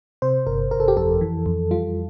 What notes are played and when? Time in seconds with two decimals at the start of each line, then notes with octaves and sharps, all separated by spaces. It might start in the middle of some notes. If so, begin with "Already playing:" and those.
0.22 C3 C5
0.47 G1 A#4
0.71 G1 A#4
0.80 A4
0.88 G4
0.97 F2 A4
1.21 E3
1.46 F2
1.71 G3 F4